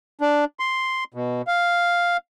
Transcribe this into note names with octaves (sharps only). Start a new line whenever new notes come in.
D4
C6
B2
F5